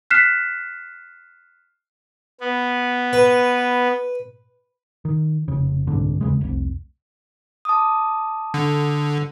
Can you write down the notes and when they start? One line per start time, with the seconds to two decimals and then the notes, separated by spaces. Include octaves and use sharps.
0.11 F6 F#6 B6 C7 E7
2.41 B3
3.13 B4
5.05 D#3
5.48 F1 C#3
5.87 F#1 C2 G#2 D3
6.21 E2 C#3 G#3
6.41 F1 C2
7.65 A5 D6 D#6
8.54 D3